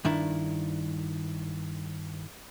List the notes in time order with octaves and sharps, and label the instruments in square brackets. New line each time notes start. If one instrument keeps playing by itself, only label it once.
[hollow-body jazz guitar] G2 D#3 D4 E4